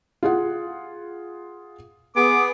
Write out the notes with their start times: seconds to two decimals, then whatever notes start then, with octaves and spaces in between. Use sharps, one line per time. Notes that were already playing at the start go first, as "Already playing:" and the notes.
0.23 F4 G#4 F#5
2.16 B3 G#4 D6